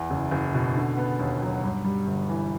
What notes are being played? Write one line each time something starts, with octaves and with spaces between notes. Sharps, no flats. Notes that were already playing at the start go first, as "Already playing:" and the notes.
Already playing: E2
F#1
F#1
B2
D3
B3
D#2
F#3
G2
G3
G1
E3